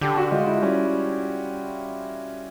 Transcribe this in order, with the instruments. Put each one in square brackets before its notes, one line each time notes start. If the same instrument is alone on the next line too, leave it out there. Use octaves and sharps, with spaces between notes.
[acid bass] D3 [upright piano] G4
[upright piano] F#4
[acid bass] G#3 [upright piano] F4
[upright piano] E4
[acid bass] G3 [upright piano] C#4